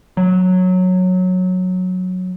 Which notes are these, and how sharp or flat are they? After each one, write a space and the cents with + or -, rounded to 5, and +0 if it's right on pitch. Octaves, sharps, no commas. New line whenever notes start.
F#3 -10